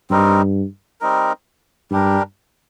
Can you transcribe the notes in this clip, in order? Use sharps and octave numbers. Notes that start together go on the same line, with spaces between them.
G2 G3 C4 D#4 A#4
G3 C4 D#4 A#4
G2 G3 D4 G4 A#4